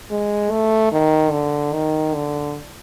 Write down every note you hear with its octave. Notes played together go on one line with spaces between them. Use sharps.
G#3
A3
D#3
D3
D#3
D3